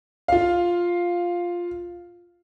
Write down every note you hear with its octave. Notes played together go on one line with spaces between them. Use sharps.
F4 F5